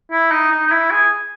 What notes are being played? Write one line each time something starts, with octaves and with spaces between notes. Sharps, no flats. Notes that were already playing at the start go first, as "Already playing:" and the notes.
E4
D#4
D#4
D#4
E4
G#4